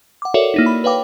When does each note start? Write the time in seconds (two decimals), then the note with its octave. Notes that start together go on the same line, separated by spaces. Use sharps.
0.22 F#5 D6
0.34 F#4 A4 A#4 C#5 D5 E5
0.54 A#3 D#4 E4
0.66 B5
0.84 B4 C#5 F5 G5 D6